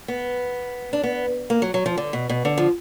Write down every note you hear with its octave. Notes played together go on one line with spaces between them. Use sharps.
B3
D4
B3
A#3
F#3
F#3
F3
D3
B2
B2
D3
F3